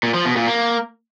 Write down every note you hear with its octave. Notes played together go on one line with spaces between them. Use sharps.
A#2
F3
B2
A#2
A#3